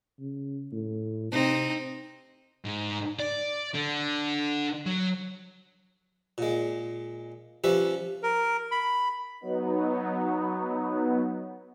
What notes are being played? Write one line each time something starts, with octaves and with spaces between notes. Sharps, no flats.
C#3
A2
C3 C4 D#4
G#2
D5
D3
F#3
A#2 G#3
F3 G3 C#4 B4 E5
A#4
B5
F#3 B3 D#4